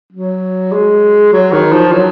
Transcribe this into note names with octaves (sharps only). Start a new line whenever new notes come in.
F#3
G#3
F#3
D#3
F3
F#3